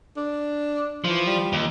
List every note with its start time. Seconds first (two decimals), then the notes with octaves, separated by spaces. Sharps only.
0.17 D4
1.05 E3 F3
1.26 G3
1.53 D#2